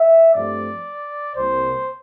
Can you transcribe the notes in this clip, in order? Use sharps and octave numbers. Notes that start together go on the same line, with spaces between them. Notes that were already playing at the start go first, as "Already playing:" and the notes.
Already playing: E5
G2 F3 A3 C4 D5
C2 C3 G3 A#3 C5